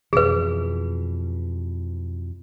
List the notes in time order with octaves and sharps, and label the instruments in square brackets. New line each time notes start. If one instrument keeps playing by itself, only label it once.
[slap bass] F2 B2 E3 [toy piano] G#4 B4